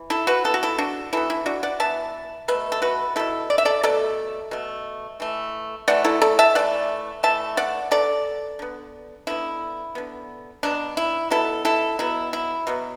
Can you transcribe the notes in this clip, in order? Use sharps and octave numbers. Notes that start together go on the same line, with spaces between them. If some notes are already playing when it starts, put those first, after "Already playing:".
Already playing: E3
E4 A4
F#4 B4
E3 B3 A4
F#4
E4 A4
D4 F#4
E3 B3 E4 A4
E4
D4 F#4
D5 F#5
E3 B3 E5 A5
B2 A3 B4 E5
A4
F#4 B4
B2 A3 E4 A4
D5
E5
A4 D5
B2 A3 A4 D5
B2 A3
E3 A3
E3 A3 D5 F#5
E4 A4
A4 D5
E5 A5
E3 A3 D5 F#5
E3 A3 E5 A5
D5 F#5
D3 B3 A4 D5
D3 B3
D3 B3 E4
D3 B3
B2 F#3 B3 D4
E4
B2 F#3 B3 E4 A4
E4 A4
B2 F#3 B3 E4
E4
B2 F#3 B3